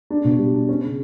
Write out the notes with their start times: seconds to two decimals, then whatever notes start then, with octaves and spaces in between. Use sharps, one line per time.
0.10 D4
0.25 B2
0.39 G3
0.54 D4
0.69 C#4
0.83 C#3